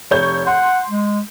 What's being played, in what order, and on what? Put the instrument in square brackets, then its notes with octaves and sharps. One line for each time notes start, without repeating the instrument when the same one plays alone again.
[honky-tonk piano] F1 C#5 G6
[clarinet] F#5 [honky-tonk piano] C6
[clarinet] G#3